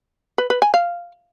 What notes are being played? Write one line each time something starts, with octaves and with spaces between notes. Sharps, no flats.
B4
B4
G#5
F5